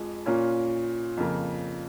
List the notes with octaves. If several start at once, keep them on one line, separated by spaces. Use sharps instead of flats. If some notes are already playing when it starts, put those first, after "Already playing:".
Already playing: F2 F3 G#3
A#2 A#3 C#4 F4
F2 C#3 A#3